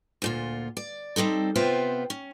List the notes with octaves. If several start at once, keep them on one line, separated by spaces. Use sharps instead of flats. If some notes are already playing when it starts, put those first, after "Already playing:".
D2 A#2 F4
D5
G3 C4 D#4 A4
C3 B3 F4 C5 E5 G5
C#4